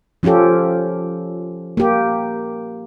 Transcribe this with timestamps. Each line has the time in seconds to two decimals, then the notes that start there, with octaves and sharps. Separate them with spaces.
0.23 F3 C#4 F4 G4 A4
1.77 A#3 G4